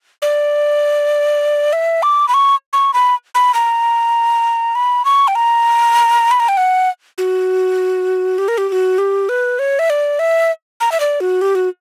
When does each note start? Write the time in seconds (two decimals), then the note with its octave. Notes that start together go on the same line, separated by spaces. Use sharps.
0.22 D5
1.73 E5
2.03 D6
2.28 B5
2.34 C#6
2.73 C#6
2.94 B5
3.35 B5
3.54 A#5
4.75 B5
5.05 C#6
5.28 G5
5.35 A#5
6.31 B5
6.40 A#5
6.48 G5
6.57 F#5
7.18 F#4
8.38 G4
8.48 A#4
8.58 G4
8.69 G4
8.72 F#4
8.98 G4
9.29 B4
9.59 C#5
9.79 E5
9.90 D5
10.19 E5
10.80 A#5
10.92 E5
11.00 D5
11.20 F#4
11.41 G4
11.55 F#4